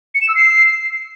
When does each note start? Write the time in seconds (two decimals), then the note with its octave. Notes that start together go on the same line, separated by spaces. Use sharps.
0.15 C#7
0.21 E7
0.28 E6
0.35 C7